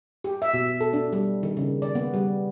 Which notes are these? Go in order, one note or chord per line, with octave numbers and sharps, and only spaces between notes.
G4
E5
B2
A4
D4
G3
D#3
C#3
D5
B3
G3